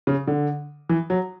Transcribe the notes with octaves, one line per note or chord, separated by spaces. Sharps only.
C#3
D3
E3
F#3